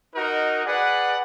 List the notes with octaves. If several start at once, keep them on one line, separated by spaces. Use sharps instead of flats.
D#4 F#4 A#4 D#5
G#4 B4 D5 F#5